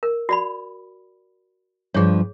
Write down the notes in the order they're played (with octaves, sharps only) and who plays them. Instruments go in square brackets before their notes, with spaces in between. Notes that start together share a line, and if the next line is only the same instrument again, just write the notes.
[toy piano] A#4
F#4 D5 B5
[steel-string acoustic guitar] G2 F3 [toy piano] G#4 C#5